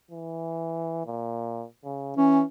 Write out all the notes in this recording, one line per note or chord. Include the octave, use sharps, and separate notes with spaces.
E3
A#2
C#3
E3 C#4